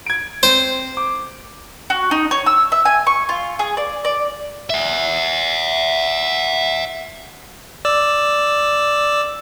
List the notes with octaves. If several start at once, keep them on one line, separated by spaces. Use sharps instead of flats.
G#6 D7
C4 C5
D6
F#4
D#4
C#5
E6
E5
G#5
C#6
F4
G#4
D5
D5
E5 F#5
D5 E6